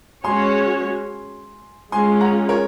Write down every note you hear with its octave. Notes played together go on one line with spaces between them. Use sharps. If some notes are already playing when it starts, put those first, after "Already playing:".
G#3 C#4 F#4 C#5 G#5 C6
G#3 C#4 F4 G#5 C6
F#5 A#5
A#4 C#5